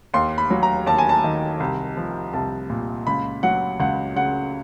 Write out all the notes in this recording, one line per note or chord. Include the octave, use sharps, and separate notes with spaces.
D#2 C6
B5
F#3
A#5
D#2 A5
G#5
A5
D#3
C2
F3
C2 A5
A#2
C#2 B5
F#3 F#5
C#2 F#5
C#3 F#5